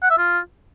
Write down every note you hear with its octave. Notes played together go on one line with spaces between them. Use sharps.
F#5
E5
F4